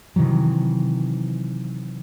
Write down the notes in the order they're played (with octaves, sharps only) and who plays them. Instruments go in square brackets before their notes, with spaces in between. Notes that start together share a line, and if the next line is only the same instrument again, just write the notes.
[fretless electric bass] C3 D#3 E3 F#3